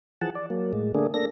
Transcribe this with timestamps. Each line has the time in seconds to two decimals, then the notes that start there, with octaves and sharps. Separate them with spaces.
0.21 E3 F3 G#4 F#5 A5
0.35 D5
0.50 F#3 A#3
0.73 A2 G#3
0.95 D3 A3 A#3 D4 G#4
1.14 A#3 D4 A4 A#6